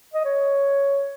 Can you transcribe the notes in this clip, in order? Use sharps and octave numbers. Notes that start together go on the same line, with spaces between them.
D#5
C#5